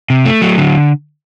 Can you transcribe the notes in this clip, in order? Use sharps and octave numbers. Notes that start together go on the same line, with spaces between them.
C3
A3
F#3
D3